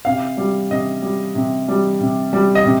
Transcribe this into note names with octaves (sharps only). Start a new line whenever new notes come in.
C3 F5
G3
C3 D#5
G3
C3
G3
C3
G3
D#5
C3